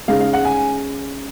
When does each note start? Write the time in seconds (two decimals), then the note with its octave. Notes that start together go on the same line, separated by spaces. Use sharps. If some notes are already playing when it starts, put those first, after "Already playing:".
0.08 C#3 G#3 D#4 F5
0.21 F5
0.33 F#5
0.45 G#5